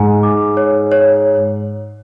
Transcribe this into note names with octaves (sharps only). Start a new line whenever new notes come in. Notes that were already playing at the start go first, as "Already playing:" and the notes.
Already playing: G#2 G#5
D6
C#5
C#5